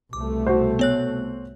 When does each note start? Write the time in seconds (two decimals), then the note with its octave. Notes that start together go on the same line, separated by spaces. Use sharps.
0.13 C2 B2 A3 D6
0.47 F#4 C5
0.79 B3 C#5 F#6